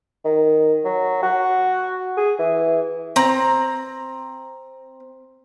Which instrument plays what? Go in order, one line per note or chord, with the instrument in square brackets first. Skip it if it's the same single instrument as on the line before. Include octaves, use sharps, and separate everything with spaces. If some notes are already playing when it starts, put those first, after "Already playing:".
[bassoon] D#3
F#3
F#4
G#4
E3
[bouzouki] C4 A#5